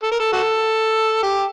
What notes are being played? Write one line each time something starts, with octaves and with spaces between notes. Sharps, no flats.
A4
A#4
A4
F#4 A4
G4